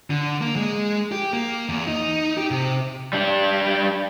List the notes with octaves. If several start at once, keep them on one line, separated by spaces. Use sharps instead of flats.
D3
A#3
G#3
G4
A#3
E2
D#4
G4
C3
G3 D4